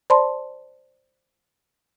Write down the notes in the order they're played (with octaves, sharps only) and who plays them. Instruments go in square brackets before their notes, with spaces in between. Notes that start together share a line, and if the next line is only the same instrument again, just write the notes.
[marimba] C5 D5 A5 B5 C6